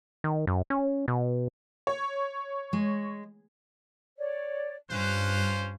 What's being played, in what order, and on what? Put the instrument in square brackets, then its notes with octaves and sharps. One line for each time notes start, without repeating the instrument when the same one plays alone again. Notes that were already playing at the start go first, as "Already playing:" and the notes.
[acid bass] D#3
F#2
C#4
B2
[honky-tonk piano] C#5
[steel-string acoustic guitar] G#3
[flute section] C#5 D5
[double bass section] G2 [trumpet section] C#4 F4 C5 [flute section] F#6